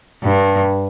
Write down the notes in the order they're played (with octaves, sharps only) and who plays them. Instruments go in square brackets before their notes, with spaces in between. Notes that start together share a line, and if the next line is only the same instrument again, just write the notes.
[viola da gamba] G2